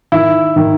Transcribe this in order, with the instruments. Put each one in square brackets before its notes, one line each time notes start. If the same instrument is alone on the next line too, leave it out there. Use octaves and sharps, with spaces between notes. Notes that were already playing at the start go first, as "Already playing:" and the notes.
[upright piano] D#3 [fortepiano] E4
[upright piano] D#3